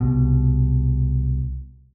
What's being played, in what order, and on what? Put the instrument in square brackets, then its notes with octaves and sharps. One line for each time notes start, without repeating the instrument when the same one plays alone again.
[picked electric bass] C2 B2